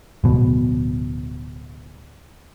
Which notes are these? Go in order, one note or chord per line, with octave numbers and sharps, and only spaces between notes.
D1 B2